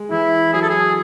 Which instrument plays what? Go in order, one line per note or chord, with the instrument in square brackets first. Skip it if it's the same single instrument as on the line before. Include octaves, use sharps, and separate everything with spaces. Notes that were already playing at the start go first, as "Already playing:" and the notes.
Already playing: [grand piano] G#3
[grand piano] E3 [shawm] E4
[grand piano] F#3 [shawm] G#4
[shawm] A4
G#4